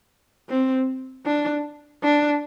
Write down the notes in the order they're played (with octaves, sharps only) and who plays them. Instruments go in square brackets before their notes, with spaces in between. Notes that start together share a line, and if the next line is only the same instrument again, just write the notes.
[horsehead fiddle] C4
D4
D4